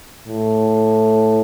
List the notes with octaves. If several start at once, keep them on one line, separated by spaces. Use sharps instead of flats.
A2